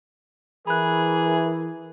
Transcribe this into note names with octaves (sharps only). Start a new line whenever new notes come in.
E3 G#4 A#4 B5 F#6